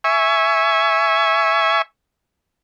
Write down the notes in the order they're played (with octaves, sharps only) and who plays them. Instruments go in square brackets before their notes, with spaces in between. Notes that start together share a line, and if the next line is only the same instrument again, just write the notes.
[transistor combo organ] E5 G#5 C#6